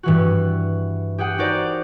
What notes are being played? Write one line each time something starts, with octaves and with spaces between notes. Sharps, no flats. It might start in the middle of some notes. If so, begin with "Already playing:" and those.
G2 E3 F#4
G4 G#4 F#5 G5
D#4 F#4 A#4 C5 D5